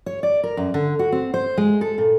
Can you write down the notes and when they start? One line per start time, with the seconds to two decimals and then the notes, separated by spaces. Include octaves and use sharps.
0.06 C#5
0.23 D5
0.44 A#4
0.57 F#2
0.74 D3
0.99 F#4
1.12 C4
1.34 C5
1.57 G#3
1.81 A4
1.98 A#2